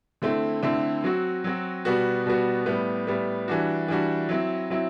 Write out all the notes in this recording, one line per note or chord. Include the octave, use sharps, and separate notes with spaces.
D3 A3 C4 E4
D3 A3 C4 E4
F#3 C4 F#4
F#3 C4 F#4
B2 G3 B3 F#4
B2 G3 B3 F#4
A2 G3 B3
A2 G3 B3
E3 G3 D4 F#4
E3 G3 D4 F#4
F#3 C4 E4
F#3 C4 E4